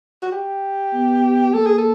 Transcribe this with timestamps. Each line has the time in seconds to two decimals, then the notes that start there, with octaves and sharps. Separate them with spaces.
0.23 F#4
0.32 G4
0.94 B3
1.54 A#3 A4
1.66 G#4
1.78 A4